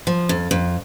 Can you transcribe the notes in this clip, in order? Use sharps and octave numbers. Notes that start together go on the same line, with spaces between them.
F3
F2
F2